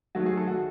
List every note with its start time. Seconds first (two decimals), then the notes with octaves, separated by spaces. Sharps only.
0.15 D#3 F#3 A3 F#4
0.26 G#4
0.37 A4
0.48 F#4